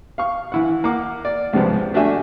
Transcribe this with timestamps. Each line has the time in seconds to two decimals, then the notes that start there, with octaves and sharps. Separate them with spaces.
0.18 F5 C#6
0.52 E3 E4 F#5
0.84 A#3 F#5 D6
1.25 D5
1.53 C#2 G#2 C3 F3 B3
1.94 A3 D4 F#4 G4 E5 G#5